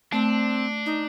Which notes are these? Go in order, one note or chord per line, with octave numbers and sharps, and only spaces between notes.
A3 C4 D4
D#4